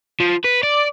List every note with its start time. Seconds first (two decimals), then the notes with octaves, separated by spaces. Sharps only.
0.20 F3
0.45 B4
0.63 D5